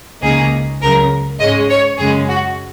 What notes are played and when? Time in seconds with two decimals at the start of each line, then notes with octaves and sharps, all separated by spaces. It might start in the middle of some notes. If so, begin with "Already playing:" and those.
0.22 C#2 C#3 A#3 D#4 G#4
0.82 C#2 C#3 F#3 A#4
1.40 G#2 G#3 C#4 D#5
1.70 C#5
1.98 F#2 C#3 G#3 C#4 G#4
2.28 F#4